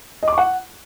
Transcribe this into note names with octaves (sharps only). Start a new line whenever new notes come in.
D#5
D6
C#6
F#5